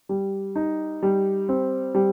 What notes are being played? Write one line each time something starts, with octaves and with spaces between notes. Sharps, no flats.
G3
D#4
G3
C4
G3